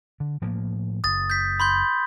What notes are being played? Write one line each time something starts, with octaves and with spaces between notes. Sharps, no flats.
D3
A2 F3 A#3
F#1 D#6 A6
G6 B6
B5 C6 G6